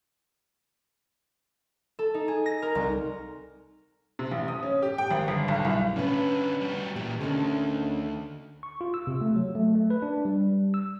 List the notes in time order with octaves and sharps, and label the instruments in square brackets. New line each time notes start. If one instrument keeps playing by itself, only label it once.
[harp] A4
D#4
G#4
A#6
A#4
C2
[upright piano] C3
A1
D#6
C#4
G4
G5
G#1
G1
B1
C2
[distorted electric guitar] D3 B3 [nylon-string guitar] C#4 B4
[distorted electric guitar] G3 F#4
[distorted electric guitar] A#2 E3 [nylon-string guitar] G4
[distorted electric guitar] D2 [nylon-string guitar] D3 D#3 C#4
[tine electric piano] C#6
F4
E6
C3
A3
F#3
A3
A3
B4
D4
G3
E6